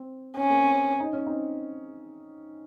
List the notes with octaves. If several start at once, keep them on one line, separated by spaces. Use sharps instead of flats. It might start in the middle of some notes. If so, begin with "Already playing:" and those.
Already playing: C4
C4 C#4
A#3
C4
D#4
C#4
C4 D#4